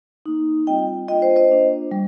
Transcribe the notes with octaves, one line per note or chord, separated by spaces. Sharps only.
A#3 D#4
G3 C4 F4 D#5 G5
A#3 D4 F4 D#5 G5
C5 D#5
C5 D#5
A#3 D4 F4
G3